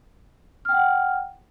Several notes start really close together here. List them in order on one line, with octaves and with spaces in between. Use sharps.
F6 G5 F#5